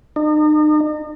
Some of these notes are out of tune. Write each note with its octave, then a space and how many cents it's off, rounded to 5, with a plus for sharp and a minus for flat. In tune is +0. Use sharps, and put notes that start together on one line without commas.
D#4 -40